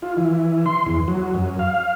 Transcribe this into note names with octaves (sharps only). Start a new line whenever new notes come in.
F4
E3
C6
E2
F#3
F#2
F5